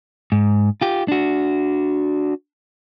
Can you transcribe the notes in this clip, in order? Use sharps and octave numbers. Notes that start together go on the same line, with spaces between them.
G#2
F4 G4
D4 F#4